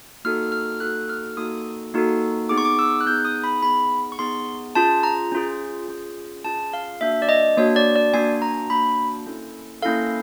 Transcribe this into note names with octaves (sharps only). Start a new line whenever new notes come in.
A#3 D#4 F#4 A4 F6
F6
A#3 D#4 F#4 A4 F#6
F6
A#3 D#4 F#4 A4 D#6
A#3 D#4 F#4 A4
B3 D#4 G#4 D6
C#6
D6
E6
F#6
B3 D#4 G#4 G6
D#6
B5
B3 D#4 G#4 B5
C#6
B3 D#4 G#4 C6
C#4 F4 G#4 A5
A#5
C#4 F4 G#4
C#4 F4 G#4
C#4 F4 G#4 A5
F5
A#3 D4 F#4 E5
D5
D#5
A#3 D4 F#4 C#5
D5
D5
A#3 D4 F#4 G#5
A#5
A#3 D4 F#4 B5
A#3 C#4 E4 A4
A#3 C#4 E4 A4 F5